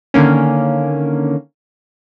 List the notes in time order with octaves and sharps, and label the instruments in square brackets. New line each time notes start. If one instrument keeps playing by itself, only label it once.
[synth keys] D3 D#3 A#3 C#4